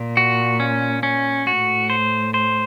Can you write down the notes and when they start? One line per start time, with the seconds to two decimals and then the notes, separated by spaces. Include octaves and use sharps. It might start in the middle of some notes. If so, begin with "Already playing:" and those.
Already playing: A#2
0.17 F#4
0.60 C#4
1.03 C#4
1.47 A2 F#4
1.90 C5
2.34 C5